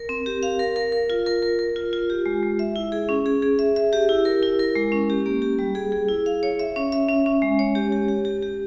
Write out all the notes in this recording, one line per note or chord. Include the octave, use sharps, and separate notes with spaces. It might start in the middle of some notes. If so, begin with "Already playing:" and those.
Already playing: A#4
C4
G4
F5
A#4
A#4
A#4
F4
A#4
A#4
A#4
F4
F4
G4
G#3
G#3
E5
E4
G#4
C#4
G#4
G#4
E5
E5
G4
E4
A#4
E4
A#4
G#3
C#4
G4
A#3
G4
G3
G#4
G#4
E4
F5
C#5
E5
C#4
E5
C#4
C#4
G#3
C#5
G4
G4
G4
G4
G4